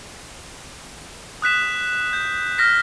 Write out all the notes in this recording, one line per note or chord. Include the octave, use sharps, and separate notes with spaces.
D#6 F#6 B6 E7
G6
F6 A#6 B6